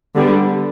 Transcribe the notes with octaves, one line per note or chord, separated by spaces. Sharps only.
D3 G3 B3